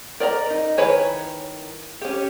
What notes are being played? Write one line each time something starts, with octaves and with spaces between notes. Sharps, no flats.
A#4 D5 D#5 A#5
D#4
D#3 E4 B4 C#5 G#5
C#4 G4